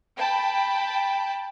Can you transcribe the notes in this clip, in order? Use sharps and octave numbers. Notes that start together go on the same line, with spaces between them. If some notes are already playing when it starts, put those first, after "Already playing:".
G5 A5 B5